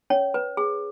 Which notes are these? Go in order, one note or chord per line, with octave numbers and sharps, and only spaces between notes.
C#4 C#5
B4
G#4